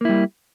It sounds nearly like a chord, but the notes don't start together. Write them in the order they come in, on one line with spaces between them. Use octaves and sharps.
A#3 E4 G3